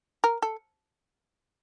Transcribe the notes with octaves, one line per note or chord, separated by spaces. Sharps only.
A#4
A4